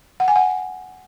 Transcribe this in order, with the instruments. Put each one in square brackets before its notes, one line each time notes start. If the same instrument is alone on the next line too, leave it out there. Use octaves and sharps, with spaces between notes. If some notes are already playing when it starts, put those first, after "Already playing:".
[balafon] F#5
G#5
F#5